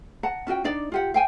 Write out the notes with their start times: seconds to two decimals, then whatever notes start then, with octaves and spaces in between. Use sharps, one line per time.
0.23 F#5 A5 A#5
0.47 C#4 F4 F#4 G5
0.64 D4 D#4 D5
0.92 F4 G4 F#5
1.14 F5 G5 G#5